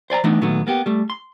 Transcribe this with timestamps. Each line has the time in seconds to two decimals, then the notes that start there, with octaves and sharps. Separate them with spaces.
0.10 C5 D5 G#5 A#5
0.24 E3 A3 B3 D4 D#4
0.41 A#2 D#3 F#3 A3 B3
0.67 A#3 B3 G4
0.86 G3 A3
1.10 C6